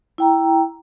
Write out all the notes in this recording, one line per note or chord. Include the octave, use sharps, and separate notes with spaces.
E4 G5 A#5